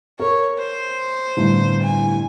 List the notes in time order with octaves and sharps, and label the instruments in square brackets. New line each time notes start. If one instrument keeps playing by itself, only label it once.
[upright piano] A#4 [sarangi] C#5
[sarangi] C5
[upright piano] G1 C2 A2
[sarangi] G#5